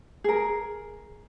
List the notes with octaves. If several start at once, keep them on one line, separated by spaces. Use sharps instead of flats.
G#4 A#4